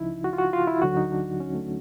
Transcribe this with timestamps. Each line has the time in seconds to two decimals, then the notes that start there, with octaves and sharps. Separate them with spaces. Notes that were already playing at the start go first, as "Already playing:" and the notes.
Already playing: C#2 C#3 F3 D#4 E4
0.24 F#4
0.33 F4
0.38 F#4
0.53 F4
0.67 E4
0.82 D2 D3 F#3 F#4
0.97 D#4
1.12 D4
1.40 C#4
1.55 A3